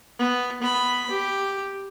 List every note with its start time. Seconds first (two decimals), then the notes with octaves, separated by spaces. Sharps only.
0.19 B3
0.62 B3 B5
1.11 G4